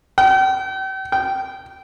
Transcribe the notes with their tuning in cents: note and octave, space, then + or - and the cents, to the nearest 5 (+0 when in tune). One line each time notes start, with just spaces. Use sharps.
G5 -40
G5 -20